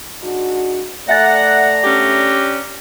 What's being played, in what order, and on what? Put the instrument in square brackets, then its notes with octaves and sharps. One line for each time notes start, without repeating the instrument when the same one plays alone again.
[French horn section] G#2 D4 F#4
[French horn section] A3 D5 [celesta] E5 G#5 A6 [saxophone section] F#5 [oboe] A#5
[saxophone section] C#4 D4 G4